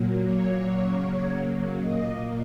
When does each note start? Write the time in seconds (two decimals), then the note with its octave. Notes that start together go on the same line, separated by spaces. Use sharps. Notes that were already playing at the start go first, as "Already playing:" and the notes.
Already playing: A#2 F#3 A#3
0.24 C#5
0.76 C#3 F#3 A#3
1.78 A#2 A#3 D#5